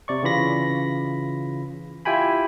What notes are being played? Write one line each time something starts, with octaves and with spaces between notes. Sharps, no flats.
C3 D5 C#6
C#3 E3 F4 B5 A#6
E4 F4 G4 G5 G#5 B5